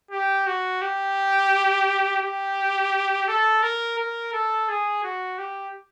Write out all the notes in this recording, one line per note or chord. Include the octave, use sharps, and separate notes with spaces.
G4
F#4
G4
G4
A4
A#4
A#4
A4
G#4
F#4
G4